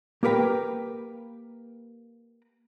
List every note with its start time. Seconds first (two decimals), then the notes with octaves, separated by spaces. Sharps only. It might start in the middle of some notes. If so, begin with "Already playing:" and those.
0.23 A#3 G4 A#4 B4 G5 A#5